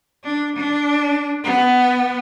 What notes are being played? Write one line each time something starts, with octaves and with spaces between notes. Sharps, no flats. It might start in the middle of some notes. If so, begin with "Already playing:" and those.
D4
D4
B3